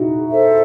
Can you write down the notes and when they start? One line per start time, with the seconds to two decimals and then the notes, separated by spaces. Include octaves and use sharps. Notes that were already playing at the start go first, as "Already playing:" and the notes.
Already playing: D#4 E4 F#4
0.30 A4 C5 E5